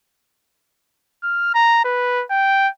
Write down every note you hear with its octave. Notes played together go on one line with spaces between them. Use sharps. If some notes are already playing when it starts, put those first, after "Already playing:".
F6
A#5
B4
G5